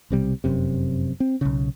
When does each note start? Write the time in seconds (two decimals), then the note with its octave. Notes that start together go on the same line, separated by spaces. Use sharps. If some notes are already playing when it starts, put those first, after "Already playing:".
0.10 B1 C3 G3
0.44 F1 F#2 C3
1.20 C4
1.41 B1 C#3